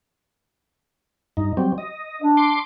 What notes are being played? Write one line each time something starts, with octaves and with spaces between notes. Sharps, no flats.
G2 D#4
F#3 G3 C4
D#5
D4
C6 D6